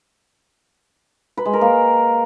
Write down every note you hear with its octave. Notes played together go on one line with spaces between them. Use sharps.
B4
G#3
A#4
A#3